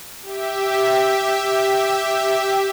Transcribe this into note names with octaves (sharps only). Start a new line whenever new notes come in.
G4 E5